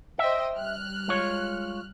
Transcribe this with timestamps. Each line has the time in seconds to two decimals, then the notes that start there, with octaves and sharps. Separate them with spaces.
0.19 C5 D#5 E5 G5
0.54 G3 F6 F#6
1.08 G#3 F4 C#5